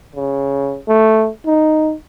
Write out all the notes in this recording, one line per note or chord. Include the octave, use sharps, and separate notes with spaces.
C#3
A3
D#4